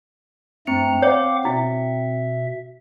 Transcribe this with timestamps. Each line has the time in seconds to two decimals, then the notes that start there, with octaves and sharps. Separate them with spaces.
0.67 G2 A3 C4 A#5 C#7
1.02 C#5 F5 F#5 D6
1.45 B2 E4 E5